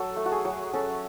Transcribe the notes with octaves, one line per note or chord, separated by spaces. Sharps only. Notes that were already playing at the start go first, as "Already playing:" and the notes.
Already playing: F#3 A4
A3
F#4
G#4
F#3
C#4 A4